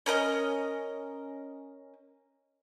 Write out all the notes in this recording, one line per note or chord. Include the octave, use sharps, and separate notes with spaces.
C#4 A#4 B4 D#5